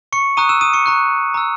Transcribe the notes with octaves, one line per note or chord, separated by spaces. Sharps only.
C#6 C#7
A#5 C#6 D#6 F#6 D#7
E6 E7
D#6 D#7
C#6 C#7
A#5 C#6 F#6
A#5 E6